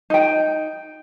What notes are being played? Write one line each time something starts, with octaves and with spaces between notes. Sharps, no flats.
D#4 G5